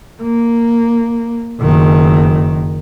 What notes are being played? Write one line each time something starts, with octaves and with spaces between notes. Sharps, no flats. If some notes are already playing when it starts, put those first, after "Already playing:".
A#3
F#1 D#3